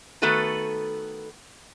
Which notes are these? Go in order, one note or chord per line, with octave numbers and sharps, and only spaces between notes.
D#3 A3 B3 F#4 A4 B4